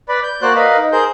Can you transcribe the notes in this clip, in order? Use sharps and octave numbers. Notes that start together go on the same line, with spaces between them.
B4 D5 B5
G6
A#3 F#4 C5 D5 F#6
A#4 B4 D#5 F5 B5
D#4
G#4 A#4 C5 G6